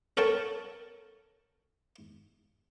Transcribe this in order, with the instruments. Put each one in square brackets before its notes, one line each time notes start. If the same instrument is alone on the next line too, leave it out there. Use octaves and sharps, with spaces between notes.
[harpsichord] A4 A#4 C#5 G5 A5